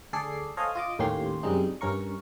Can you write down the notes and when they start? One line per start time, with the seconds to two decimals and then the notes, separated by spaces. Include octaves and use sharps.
0.13 D2 G#4 A4 D5 C7
0.57 A4 C5 C#5 D#5 F5 G#5
0.75 F4 D#5 D6
0.99 D#2 A2 A#3 C#4 G4 C6
1.43 F#2 C3 G3 G#3 D#4
1.81 G2 C#4 A#4 C#6